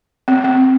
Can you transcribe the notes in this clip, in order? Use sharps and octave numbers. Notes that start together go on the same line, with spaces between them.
C4
C4